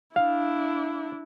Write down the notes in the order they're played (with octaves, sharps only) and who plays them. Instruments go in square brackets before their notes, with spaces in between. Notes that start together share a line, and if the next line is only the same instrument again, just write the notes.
[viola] D4 E4 [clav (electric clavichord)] F5